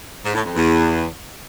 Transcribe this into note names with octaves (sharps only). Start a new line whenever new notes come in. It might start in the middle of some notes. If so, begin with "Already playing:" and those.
G#2
A2
F2
E2